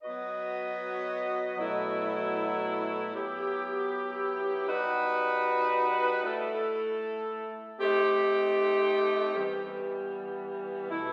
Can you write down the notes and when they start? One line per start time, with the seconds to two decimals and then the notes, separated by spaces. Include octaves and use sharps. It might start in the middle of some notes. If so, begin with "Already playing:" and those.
0.02 F#3 B3 F#4 B4 D#5
1.57 B2 F#3 A3 E4
3.14 F#3 B3 E4 G4
4.68 G3 D#4 F#4 B4
6.24 A3 E4 A4
7.79 A3 C4 D#4 G4
9.34 E3 G3 B3
10.90 B2 A3 E4